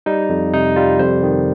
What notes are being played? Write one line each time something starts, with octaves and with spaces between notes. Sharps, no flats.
G3 D#4
F2
C3 D#4
G3 F4
F2 C5
D#3